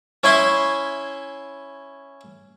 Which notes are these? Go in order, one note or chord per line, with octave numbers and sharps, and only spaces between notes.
C#4 E4 G#5 B5 C6